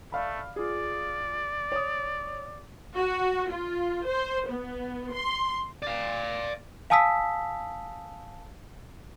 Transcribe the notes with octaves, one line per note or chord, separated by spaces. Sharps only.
A3 D5 F5 B5
F4 G#4 D5
C#5 D#6
F#4
F4
C5
B3
C6
D5 F5
F5 G#5 A5 D#6 E6 B6